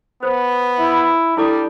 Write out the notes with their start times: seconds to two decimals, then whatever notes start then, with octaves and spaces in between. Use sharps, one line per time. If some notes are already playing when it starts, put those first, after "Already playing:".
0.23 B3 C5
0.79 E4
1.37 G3 D4 E4 A4 D6